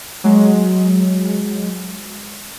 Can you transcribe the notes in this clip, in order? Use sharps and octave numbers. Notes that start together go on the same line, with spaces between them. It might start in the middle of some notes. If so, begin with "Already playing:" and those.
F#3 G#3